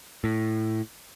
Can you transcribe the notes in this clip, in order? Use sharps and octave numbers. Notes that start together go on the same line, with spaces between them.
A2